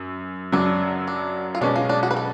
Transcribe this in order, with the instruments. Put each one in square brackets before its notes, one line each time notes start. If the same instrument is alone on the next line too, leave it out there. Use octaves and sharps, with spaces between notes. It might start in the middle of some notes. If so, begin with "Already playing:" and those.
Already playing: [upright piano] F#2
[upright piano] F#2 C#3 F#3 [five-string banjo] D4
[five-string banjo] D4
F4
[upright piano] B2 G#3 C#4 [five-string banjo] D4
[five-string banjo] F4
D4
F#4
B4
A4